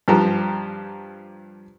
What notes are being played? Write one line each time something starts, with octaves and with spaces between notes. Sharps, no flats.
G2 F3 G4 A#5